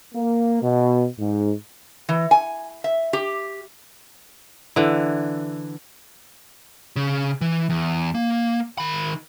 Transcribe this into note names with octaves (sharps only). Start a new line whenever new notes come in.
A#3
B2
G#2
E3
G#5
E5
G4
D3 E3
C#3
E3
E2
A#3
D#3 B5